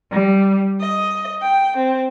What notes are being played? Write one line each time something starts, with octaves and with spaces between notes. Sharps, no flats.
G3
D#5
G5
C4